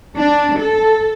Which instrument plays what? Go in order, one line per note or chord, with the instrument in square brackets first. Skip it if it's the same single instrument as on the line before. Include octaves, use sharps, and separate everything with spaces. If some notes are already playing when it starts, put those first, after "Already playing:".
[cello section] D4
A4